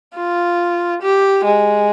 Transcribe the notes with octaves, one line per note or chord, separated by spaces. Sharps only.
F4
G4
G#3